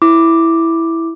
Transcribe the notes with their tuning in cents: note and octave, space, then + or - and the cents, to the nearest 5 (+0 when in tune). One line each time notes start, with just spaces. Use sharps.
E4 +0 D6 +0